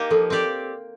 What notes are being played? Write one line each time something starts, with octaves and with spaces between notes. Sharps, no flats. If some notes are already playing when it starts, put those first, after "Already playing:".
Already playing: A#3 D#4 G4
F3 A4
C4 G4 D5